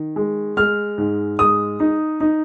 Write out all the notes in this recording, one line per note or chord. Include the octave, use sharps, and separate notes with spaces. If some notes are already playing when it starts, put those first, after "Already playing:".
Already playing: D#3
G#3
G#3 F6
G#2
G#3 D#6
D#4
D#4